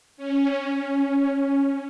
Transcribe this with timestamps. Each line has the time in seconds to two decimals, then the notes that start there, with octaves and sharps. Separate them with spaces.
0.17 C#4
0.75 C#4